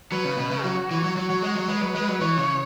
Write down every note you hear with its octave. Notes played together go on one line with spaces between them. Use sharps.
F#3 B4
C#3
B2
C#3
F#3 F#4
E3
F#3
F#3 F#4
F#3
G#3
F#3
G#3 B4
F#3
G#3
F#3
E3 C#5
C#3